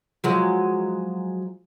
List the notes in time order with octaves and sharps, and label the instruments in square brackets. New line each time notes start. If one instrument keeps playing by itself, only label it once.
[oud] F3 F#3 G#3